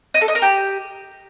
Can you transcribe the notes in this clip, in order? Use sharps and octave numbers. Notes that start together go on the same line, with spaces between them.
D#5
A4
D#5
A#4
G4